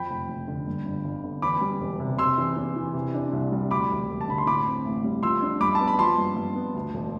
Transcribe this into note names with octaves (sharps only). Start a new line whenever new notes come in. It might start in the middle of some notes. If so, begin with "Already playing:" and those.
Already playing: F2 G5 B5
F1
F1
D3
G2
G1
G1
D3
E2 B5 D6
G3
E1
C3
C3 C6 E6
E2
E2
E3
C3
D4
C2
G3
D2 B5 D6
E1
E1
A5
D3 B5
C6
A2 B5 D6
C4
A1
G3
F3 C6 E6
D4
G2 B5 D6
A5
B3
B5
F3 A5 C6
G2
G2
B3
D2
E1